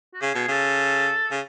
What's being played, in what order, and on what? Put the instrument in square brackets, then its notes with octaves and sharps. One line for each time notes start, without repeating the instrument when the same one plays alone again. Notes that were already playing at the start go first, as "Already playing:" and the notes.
[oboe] F#4
[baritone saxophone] C#3 [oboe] G#4
[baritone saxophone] B2
[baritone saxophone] C#3 [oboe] A4
[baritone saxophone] C#3